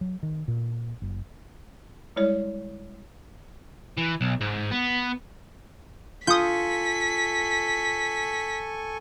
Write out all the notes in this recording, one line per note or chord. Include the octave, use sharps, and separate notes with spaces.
F#3
D#3
A#2
F#1
G3 G#3 E4 C#5 D5
E3
B1
G#2
B3
F4 A4 G#5 C#6 D#6 G6 B6